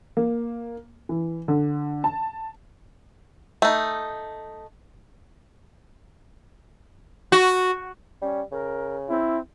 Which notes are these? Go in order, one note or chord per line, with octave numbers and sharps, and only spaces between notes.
A#3
E3
D3
A5
A3 D#4
F#4
G3 C#4
C#3 A#4
C4 E4